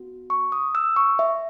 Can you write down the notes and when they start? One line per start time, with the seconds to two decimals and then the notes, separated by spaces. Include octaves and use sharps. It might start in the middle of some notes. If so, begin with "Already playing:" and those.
Already playing: B3 F#4
0.30 C#6
0.52 D#6
0.75 E6
0.96 C#6
1.19 E5